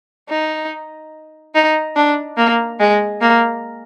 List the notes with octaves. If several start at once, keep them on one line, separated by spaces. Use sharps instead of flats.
D#4
D#4
D4
A#3
G#3
A#3